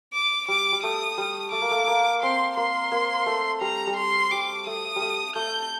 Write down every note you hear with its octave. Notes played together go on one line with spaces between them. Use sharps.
D6
G3 D6
G3
A3 D#6
G3
A3 D6
A#3
A3
A#3
C4 C6
A#3 C6
A#3
A3
G3 A#5
G3
C6
G3 D6
A3 D#6
G3
A3
A3 G6